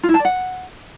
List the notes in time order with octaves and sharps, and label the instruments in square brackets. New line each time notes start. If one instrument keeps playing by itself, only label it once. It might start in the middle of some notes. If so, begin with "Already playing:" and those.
[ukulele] F4
E4
A5
D5
F#5